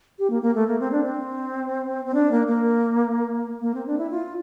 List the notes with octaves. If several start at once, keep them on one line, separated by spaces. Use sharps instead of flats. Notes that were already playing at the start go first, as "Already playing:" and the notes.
G4
A#3
A#3
A3
A#3
C4
D4
C4
C4
D4
A#3
A#3
A#3
C4
D4
E4
F4